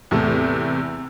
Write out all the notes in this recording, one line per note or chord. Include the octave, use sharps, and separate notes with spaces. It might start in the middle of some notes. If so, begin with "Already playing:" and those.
E2 A2 C3 A3